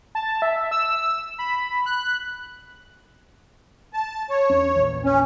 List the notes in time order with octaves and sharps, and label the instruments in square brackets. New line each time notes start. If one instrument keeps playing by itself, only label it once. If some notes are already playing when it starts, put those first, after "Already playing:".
[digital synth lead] A5
E5
E6
B5
F#6
[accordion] A5
C#5
[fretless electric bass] E2 C#4
A#1 E2
[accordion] C#4